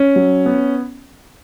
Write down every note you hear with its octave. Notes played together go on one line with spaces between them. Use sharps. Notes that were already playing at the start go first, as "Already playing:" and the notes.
Already playing: C#4
F#3
B3